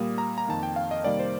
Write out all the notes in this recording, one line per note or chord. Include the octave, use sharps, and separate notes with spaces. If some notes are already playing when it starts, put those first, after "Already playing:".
Already playing: A#2 G3 A#3 D#6
A#5
A#5
F2 D#3 A#3 A5
G5
F5
D#5
C3 D#3 G3 A#3 D5
C5